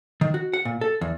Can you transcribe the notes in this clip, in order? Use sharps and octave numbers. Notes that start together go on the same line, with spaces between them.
D#3
F#4
F#5
A#2
A4
E2